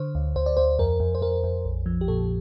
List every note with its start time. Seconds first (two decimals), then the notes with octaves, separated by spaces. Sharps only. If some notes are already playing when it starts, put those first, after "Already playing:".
Already playing: D3 C5
0.15 D2
0.36 D2 C5
0.46 D5
0.57 D2 C5
0.79 F2 A#4
1.00 F2
1.15 C5
1.22 F2 A#4
1.43 F2
1.65 A#1
1.86 F3
2.01 G4
2.08 A#2 A4